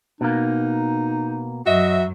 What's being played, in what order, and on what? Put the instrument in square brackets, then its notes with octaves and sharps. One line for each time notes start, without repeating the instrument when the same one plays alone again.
[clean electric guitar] B2 A#3 [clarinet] D#4
[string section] F#2 F#3 [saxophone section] F#4 E5 [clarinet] D#5